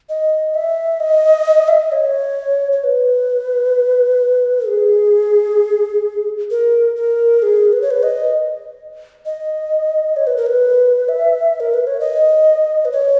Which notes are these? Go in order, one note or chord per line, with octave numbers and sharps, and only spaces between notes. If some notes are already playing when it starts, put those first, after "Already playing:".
D#5
E5
D#5
E5
D#5
C#5
C#5
B4
G#4
A#4
A#4
G#4
B4
C#5
B4
D#5
D#5
C#5
B4
A#4
B4
E5
A#4
B4
C#5
D#5
B4
C#5